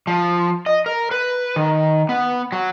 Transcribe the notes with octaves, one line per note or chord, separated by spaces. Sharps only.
F3
D#5
A#4
B4
D#3
B3
F#3